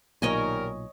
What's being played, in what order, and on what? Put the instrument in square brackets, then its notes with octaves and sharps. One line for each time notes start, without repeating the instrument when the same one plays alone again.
[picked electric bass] B1 A#2 [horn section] D#3 G3 A#4 [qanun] C#5 D#5 G#5